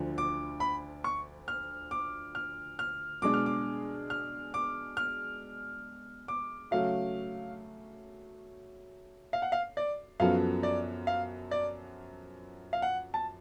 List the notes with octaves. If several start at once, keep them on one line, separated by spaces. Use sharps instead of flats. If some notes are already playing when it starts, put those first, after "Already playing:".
Already playing: D2 D3 F3
D6
B5
C#6
F6
D6
F6
F6
B2 G#3 D4 G#4 D6
F6
D6
F6
D6
F6
D6
C#3 F#3 A3 C#4 F#4 F5
F5
F#5
F5
D5
F#2 F3 B3 F#4 A4 F5
D5
F5
D5
F5
F#5
A5